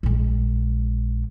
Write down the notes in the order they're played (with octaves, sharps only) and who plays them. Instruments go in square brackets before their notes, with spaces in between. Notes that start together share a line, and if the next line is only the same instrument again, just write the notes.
[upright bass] A#1 G#3